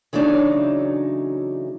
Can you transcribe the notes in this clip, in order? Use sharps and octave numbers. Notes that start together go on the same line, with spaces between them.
C#3 E3 F#3 A3 D4 D#4